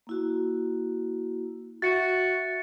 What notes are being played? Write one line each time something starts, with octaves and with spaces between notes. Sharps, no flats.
A#3 E4 F#4
F#4 E5 A6 C#7